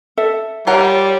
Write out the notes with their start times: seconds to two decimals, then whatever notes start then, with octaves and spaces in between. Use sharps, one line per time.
0.17 A4 E5
0.67 G3 F4 A#4 C#5 F#5